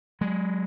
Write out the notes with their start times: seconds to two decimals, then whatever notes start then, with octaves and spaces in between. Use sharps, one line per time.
0.21 F#3 G#3